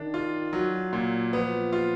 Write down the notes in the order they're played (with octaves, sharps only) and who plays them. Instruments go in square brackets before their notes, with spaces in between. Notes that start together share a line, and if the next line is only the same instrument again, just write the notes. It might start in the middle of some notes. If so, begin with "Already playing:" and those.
Already playing: [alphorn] D#3 [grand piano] D4
[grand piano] F4
F#3
A#2
[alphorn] F3 [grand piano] B3
[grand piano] F4